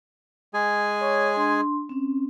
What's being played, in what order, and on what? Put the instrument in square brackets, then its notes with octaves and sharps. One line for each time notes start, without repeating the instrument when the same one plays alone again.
[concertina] G#3 G#4 G#5
[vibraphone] C#5 C#6
D4 C6
C4 C#4